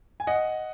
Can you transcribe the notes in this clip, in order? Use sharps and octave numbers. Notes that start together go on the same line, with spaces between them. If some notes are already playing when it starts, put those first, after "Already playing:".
G#5
D#5 F#5